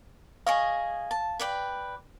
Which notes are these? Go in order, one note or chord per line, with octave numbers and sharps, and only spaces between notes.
G#4 C#5 D#5 F5
A5
B4 D5 G5